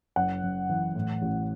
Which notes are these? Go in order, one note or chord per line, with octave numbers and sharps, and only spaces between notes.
F#1 F#5
F#1
E3
A2
A1